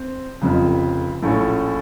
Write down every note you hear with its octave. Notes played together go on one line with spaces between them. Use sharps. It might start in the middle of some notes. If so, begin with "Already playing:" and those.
Already playing: C4
F1 F2 C#3
A#1 A2 A3 C#4